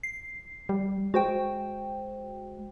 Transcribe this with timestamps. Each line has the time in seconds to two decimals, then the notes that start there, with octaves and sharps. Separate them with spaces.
0.03 C7
0.69 G3
1.14 G#3 F#4 C5 G5